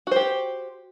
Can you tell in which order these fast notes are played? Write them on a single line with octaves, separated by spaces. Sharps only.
F#4 C5 G4